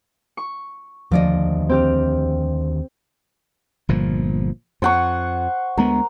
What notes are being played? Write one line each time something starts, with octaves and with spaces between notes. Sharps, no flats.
C#6
D#2 D3 F3 D5 D#5
C4 G4 F6
G1 A#2 F3
F2 C5 F#5 C#6
D2 G#3 B3 A#4